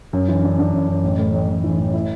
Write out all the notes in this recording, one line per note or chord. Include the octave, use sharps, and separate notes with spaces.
F#2
E3
D4
D4
F#2
F#2
A1
A2
A1
A1
E3
A1
E4